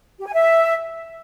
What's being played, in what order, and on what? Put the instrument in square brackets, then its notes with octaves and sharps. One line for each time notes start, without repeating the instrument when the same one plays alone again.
[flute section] G4
G#5
E5